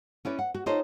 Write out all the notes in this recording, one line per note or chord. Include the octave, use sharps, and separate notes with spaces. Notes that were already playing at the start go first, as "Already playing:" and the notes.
C#4 E4 B4 D5
F#5
F#4
D#4 F4 A4 C5 C#5 D#5